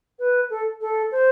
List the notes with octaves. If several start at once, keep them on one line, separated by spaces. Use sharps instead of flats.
B4
A4
A4
C5